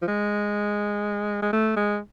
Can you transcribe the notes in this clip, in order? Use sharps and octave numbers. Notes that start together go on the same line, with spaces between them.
F3
G#3
G#3
A3
G#3